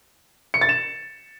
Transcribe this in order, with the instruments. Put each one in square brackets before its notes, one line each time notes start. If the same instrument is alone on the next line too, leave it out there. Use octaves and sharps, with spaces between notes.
[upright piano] C#7
A6
E7